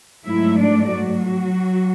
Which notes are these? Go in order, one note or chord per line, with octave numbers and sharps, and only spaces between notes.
G#2 F#3 A3 E4 E5
D4 D5
F#3 F#4